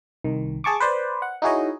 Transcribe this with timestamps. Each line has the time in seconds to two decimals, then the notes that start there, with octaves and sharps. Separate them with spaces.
0.24 C2 D#3
0.64 G#4 A5 C#6 D6
0.80 B4 C5 D5
1.22 F#5
1.42 D#4 E4 F#4 G#4 C#5 D#5